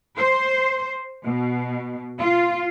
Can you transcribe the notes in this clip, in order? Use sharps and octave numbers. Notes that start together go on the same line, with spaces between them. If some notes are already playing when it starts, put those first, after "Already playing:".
C5
B2
F4